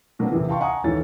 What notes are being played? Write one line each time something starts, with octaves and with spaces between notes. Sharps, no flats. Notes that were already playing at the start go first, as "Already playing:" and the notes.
B2 F#3 A#3 C4 D4
E2 C3 E3
F5 G5 A5 C6 C#6
D#5 F#5 G#5 A#5 C#6 D#6
D#2 G#2 E3 A4 C#5 A6